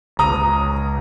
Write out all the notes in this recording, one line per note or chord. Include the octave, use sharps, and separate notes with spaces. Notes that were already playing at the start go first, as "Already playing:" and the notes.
C#2 A#5 D#6